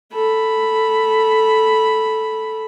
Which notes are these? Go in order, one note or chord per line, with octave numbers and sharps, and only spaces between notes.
A4 B5